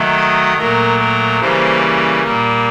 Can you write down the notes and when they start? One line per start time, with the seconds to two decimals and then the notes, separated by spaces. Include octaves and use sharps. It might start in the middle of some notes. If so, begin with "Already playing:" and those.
Already playing: D#3 F#3 A3
0.17 D#5
0.58 A#2 F#3 A3 A#4
1.00 A#4
1.41 C#3 E3 G3 A#3 C5
2.23 A#2 G3 A#3